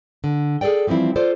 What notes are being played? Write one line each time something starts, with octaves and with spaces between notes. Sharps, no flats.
D3
G#4 A4 C5 D5 G5
E3 F3 G3 C4 E4
F4 A4 C5 D5